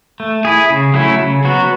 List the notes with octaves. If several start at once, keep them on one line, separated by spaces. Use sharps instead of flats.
A3
E4 G#4
C#3
F#3 A3 C#4 E4
C#3
F#3 B3 F#4